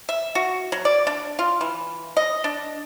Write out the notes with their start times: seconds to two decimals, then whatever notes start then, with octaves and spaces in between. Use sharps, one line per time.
0.09 E5
0.35 F#4
0.72 F#3
0.85 D5
1.07 D4
1.39 F4
1.61 E3
2.17 D#5
2.44 D4